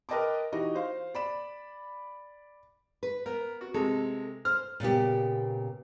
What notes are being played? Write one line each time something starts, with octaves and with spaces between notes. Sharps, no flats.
A#4 B4 D#5 G5 A5 D6
E3 D#4 F#4 G4 D#5
C5 F5
D5 B5 E7
B4
B3 A#4
F#4
C3 G#3 A4
C5 F6
A#2 C#3 B3 G4